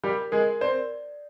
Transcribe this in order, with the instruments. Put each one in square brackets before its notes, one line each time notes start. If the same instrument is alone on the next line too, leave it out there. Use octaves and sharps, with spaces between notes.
[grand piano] G3 G4 [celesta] A#4
[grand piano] G#3 G#4 [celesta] A#4
[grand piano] C4 C5 [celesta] D5